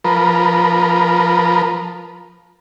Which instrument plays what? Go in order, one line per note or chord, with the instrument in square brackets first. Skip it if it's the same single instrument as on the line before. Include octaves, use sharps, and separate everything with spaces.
[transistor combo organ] F3 A#4 B4